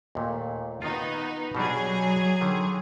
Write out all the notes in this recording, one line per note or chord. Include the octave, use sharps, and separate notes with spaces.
D#2 A#2 A3
D#3 B3 D#4 F4
B2 F#3 G3 D4 G#4
D3 D#3